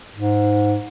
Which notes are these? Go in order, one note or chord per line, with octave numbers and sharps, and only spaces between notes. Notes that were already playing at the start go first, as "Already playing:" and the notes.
G#2